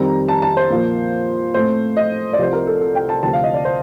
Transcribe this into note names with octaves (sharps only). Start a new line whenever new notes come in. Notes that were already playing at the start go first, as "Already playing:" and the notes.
Already playing: F2 D#3 G3 C4 A#5
A5
A5
C5
A#2 F3 A#3
A2 A3 C4 C5
D#5
D5
C2 C3 F3 C5
A#4
A4
A4
G5
A5
D2 C3 F3 C4 A5
F5
D#5
D5
C5